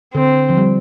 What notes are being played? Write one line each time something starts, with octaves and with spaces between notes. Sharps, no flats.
D3 C4
F3
G3